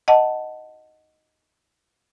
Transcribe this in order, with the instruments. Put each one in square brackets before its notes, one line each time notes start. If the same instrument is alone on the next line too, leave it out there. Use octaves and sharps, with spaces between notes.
[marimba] D#5 F#5 A5